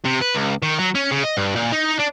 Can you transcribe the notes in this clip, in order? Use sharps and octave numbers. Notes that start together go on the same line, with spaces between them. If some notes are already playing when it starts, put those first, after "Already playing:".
C3
B4
C#2
D#3
F#3
C#4
C#3
D#5
G2
A#2
D#4
D4